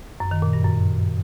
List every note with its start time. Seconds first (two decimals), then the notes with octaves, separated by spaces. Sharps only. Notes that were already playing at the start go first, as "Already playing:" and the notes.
0.20 F#2
0.31 D#3
0.42 A#2
0.53 G2
0.64 F#2